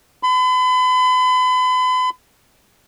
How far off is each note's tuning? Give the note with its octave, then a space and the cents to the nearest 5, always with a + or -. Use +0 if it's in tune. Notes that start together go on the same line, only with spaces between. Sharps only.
B5 +40